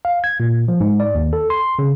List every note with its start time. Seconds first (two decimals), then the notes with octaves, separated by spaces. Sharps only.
0.05 F5
0.24 G#6
0.40 A#2
0.68 F3
0.80 G#2
1.00 D5
1.15 D#2
1.33 A4
1.50 C6
1.79 C#3